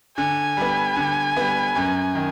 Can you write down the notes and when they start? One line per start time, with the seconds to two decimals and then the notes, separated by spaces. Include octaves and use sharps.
0.17 D3 G#5
0.57 G3 B3
0.96 D3
1.37 G3 B3
1.75 F#2
2.15 D#3